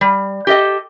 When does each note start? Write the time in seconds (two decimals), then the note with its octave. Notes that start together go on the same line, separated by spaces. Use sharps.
0.01 G3
0.47 G4 A4 D5 D#5 G5